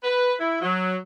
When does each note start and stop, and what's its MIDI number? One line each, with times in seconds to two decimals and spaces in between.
0.03 0.33 71
0.39 0.60 64
0.61 0.96 54